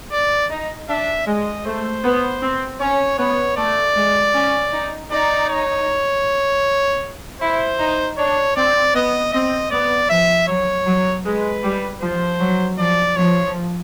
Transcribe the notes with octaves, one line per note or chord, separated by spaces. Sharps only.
D5
D#4
D4 E5
G#3 D#5
A3 C5
B3
C4
C#4 C#5
B3 C#5
A3 D5
G#3
C#4
D#4
D#4 D5
C#5
E4 C5
D#4
D4 C#5
C4 D5
B3 D#5
C4 D#5
B3 D5
F3 E5
F#3 C#5
F#3
G#3 B4
G3
F3 C5
F#3
F3 D5
F3 C#5